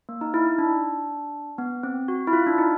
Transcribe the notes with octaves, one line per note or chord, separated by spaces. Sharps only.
A#3
D#4
E4
D#4
D4
B3
C4
F#4
E4
F4
D4
D#4